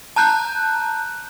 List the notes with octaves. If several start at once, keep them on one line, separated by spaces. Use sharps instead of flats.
A5 A#5 F#6 G6